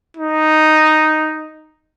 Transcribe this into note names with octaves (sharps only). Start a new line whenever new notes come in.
D#4